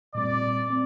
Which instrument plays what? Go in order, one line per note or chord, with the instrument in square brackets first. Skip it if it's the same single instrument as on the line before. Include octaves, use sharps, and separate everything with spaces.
[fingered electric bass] A#2 G3 C4 [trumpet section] D5
[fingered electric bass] C4